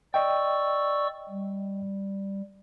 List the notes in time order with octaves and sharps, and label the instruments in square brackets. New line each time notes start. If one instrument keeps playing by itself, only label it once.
[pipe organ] D5 C#6 E6 [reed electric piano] D#5 G5
[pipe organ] G3